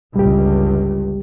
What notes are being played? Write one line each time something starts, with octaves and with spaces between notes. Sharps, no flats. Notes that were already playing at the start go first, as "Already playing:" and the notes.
G1 C#2 G3 G4